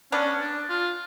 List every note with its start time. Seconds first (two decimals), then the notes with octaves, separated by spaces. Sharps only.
0.12 B3 C#4 D4
0.41 D4
0.69 F4